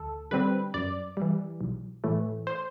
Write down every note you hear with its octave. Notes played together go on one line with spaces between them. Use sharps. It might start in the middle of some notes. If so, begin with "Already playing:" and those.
Already playing: D2 A4
D3 G3 C4 B4
F#2 D5
E3 G3
B1
A2 E3 A3
C5